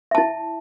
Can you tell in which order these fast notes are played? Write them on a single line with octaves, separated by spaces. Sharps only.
E5 A5 E4